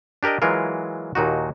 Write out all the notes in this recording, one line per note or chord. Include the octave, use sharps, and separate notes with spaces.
D4 G4 A#4 D5 D#5
E3 F#3 G#3 F4 A#4
D#2 A#2 D#4 F#4